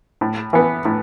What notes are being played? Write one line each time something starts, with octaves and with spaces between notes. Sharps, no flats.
A2
E3 B3
A2